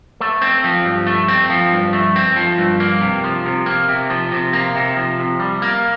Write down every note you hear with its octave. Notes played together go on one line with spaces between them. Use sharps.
A3
C4
F3
G2
A3
C4
F3
G2
A3
C4
F3
G2
A#3
C3
F3
C3
A#3
C3
F3
C3
A#3
C3
F3
C3
G3
A#3